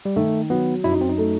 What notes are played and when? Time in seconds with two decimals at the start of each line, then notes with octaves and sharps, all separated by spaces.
0.05 G3
0.16 D#3 A3
0.50 F#3 B3
0.84 F#2 E4
0.92 D#4
1.01 C4
1.09 D#4
1.18 A3